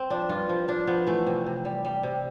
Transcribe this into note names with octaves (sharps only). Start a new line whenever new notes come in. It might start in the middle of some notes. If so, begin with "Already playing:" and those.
Already playing: C4
F3 D4
G2 F4
F3
F3 D4
F3 B3
E3 A3
C3
C3
G3
G3
C3